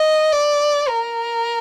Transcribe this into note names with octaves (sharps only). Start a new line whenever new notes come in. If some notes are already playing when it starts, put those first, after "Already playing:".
Already playing: D#5
D5
A#4